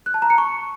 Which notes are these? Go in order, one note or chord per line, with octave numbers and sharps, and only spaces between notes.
F#6
A5
A#5
C#7
C#6